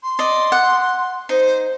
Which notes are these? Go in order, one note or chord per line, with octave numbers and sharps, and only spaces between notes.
C6
D5 D#5
F#5
D#4 C5